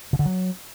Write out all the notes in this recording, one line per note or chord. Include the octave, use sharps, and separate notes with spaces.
C#3
D3
F#3